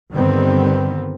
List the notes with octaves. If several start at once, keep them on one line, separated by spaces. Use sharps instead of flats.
G2 D3 D#3 G3 B3 C4